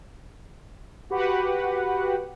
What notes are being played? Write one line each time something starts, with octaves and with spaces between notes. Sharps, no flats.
F#4 G4 B4 F#5